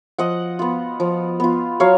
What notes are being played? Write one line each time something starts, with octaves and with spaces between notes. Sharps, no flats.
F3 D#5 F#5
B3 F4
F3
B3 F4
F#3 C#5 F5